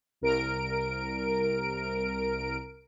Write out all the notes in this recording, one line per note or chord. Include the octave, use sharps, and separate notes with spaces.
C2 A#4 D7